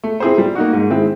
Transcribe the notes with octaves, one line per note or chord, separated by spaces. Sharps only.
A3
C4 E4 G#4 C5
G3
A#3 D#4 F#4
G#2
D#3 G#3 C4 E4